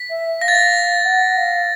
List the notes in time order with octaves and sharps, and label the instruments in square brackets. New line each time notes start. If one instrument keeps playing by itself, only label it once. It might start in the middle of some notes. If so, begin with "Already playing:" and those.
Already playing: [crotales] B6
[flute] E5
[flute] F5 [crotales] A#6
[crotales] A6
A#6
[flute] F#5
F5